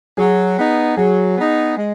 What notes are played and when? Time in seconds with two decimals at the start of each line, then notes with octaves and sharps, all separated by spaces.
0.17 F#3 G#4
0.57 B3 D#4
0.97 F#3 G#4
1.37 B3 D#4
1.76 G#3